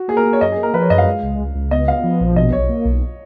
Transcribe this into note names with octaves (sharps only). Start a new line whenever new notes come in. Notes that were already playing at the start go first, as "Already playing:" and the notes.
Already playing: F#4
A#3 G#4
A#4
A#3
C#5
F#2 D#5
G#4
A#3
A#4
F3 B4
C#5
F#2 D#5
F5
G#3
C#2
C#2
C#2
B3 D#5
B3 F5
F3
A#1
B2 D#5
B1 C#5
A#3
B1